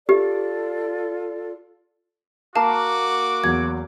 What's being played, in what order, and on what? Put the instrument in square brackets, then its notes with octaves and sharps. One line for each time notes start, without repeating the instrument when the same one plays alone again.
[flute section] F4 A4 D5 [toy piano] G4
[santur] A#3 A#4 [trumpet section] F#4 D6 [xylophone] F5 A5
[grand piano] E2 F#3 [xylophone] G#6